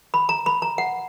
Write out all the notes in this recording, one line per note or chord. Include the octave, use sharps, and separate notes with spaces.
B5
A#5
B5
A#5
F#5